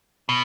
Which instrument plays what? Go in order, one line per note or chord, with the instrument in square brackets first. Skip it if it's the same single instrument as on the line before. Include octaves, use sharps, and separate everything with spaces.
[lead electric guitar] B2